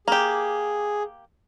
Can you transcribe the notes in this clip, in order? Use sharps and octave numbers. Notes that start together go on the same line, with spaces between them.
A#3 G4 G#4